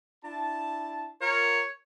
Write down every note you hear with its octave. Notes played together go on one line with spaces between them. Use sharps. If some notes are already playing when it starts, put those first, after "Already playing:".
D4 E4 A5
F4 A#4 C#5